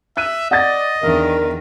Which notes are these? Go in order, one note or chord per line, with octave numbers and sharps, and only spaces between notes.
E5 F#6 D#7
D5 D#5 F#5 A6
E2 D#3 D4 A#4 E5